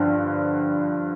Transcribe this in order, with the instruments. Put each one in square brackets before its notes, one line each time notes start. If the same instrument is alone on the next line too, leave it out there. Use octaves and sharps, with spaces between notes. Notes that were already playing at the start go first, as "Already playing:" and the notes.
Already playing: [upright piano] G2 D3 F3